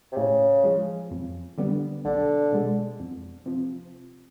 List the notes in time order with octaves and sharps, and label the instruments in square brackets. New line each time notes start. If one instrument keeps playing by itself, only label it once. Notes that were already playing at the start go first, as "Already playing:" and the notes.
[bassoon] C3
[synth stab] A2 [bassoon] C#3
[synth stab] F3 G#3
F2
D3 G3 B3
[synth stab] B1 [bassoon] D3
[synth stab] B2 G#3
F2
C3 F3